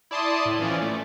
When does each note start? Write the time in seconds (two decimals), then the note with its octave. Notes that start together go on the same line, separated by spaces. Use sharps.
0.11 E4 D5 A5 C6 D#6
0.45 A2
0.59 E3 F3 C#4 D5
0.82 A3